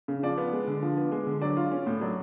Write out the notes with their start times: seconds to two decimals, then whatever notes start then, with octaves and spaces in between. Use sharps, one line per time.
0.08 C#3
0.23 F3 D5
0.38 B3
0.53 G#3
0.68 D3
0.83 F3
0.97 B3
1.12 G#3
1.27 D3
1.42 F#3 D5
1.57 F4
1.71 C#4
1.86 A2
2.01 F#3 D5